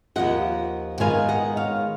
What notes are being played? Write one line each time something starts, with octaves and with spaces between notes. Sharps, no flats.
D#2 C#3 F3 D#5 F#5
G#2 D#3 G#3 B3 F5 G#5
D#5 F#5
C#5 F5